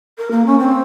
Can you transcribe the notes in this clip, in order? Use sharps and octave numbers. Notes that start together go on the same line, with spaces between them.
A#4
A#3
C#4
C4